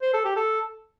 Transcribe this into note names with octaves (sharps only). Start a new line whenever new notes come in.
C5
A4
G4
A4